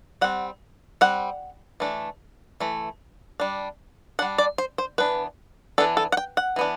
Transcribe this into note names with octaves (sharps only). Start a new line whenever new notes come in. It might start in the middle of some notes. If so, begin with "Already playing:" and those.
G3 C4 F#5
G3 C4 F#5
E3 A3 D4
E3 A3
G3 D4
G3 D4 F#5
D5
C5
C5
E3 B3 D4 B4
E3 B3 D4 A4
A4
F#5
G5
F#5
E3 B3 D4